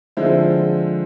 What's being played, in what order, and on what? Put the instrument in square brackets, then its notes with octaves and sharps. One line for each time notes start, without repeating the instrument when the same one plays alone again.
[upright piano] D3 F3 G#3 C4 E4